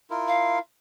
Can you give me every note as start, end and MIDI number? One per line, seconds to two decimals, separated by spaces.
0.10 0.59 64
0.10 0.59 65
0.10 0.59 70
0.28 0.59 77